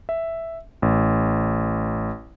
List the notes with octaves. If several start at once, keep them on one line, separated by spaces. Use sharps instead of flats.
E5
A1